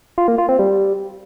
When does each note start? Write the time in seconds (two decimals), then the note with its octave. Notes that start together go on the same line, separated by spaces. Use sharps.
0.18 F4
0.28 A#3
0.38 F4
0.49 C4
0.59 G3